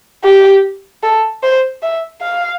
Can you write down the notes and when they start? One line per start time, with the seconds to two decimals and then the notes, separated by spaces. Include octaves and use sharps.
0.24 G4
1.03 A4
1.43 C5
1.83 E5
2.22 F5